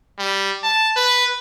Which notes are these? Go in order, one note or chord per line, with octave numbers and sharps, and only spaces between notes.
G3
A5
B4